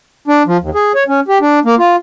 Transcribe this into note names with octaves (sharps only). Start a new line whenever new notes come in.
D4
F3
D#2
G#4
C#5
C#4
G4
D4
A#3
F4